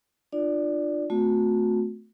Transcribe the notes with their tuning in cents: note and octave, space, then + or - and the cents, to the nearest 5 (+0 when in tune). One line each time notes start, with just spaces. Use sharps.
D4 +35 F4 +0 D5 +0
A3 +0 C4 -40 F#4 -35